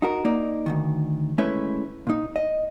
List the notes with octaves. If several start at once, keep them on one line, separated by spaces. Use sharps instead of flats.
D#4 F#4 A#4
A#3 D#4 D5
D2 G#2 D#3
G#3 A3 C#4 E4 B4 E5
A#2 D#4
D#5